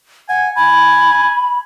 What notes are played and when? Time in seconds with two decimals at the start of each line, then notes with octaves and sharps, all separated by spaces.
0.29 F#5 G#5
0.56 G#5 B5